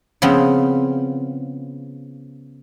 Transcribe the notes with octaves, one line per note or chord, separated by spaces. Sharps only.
C#3 F3 B3 C4